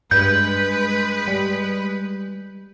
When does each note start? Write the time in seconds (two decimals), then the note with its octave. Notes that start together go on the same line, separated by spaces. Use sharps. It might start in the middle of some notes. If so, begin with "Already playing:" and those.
0.11 G2 G#3 B4 G6
1.28 G3